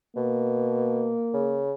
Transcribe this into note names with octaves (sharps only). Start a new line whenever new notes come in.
B2 A#3
C#3